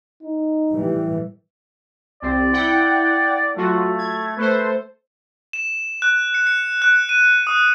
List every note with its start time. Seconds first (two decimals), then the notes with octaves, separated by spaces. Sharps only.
0.23 D#4
0.72 A2 E3 G3
2.22 C2 C4 D5
2.53 E4 F#5 G5
3.56 F#3 A3 F4 F#4
3.98 G#6
4.37 A3 A4 B4 C5
5.53 E7
6.02 F#6
6.34 C#7
6.47 C#7
6.82 F#6
7.09 D#7
7.47 D#6